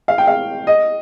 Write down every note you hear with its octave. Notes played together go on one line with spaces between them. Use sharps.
F5
G5
F5
D#5